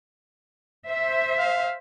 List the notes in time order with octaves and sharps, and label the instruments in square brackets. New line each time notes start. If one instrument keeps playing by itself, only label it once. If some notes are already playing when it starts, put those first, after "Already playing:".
[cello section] C5 E5
[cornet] F5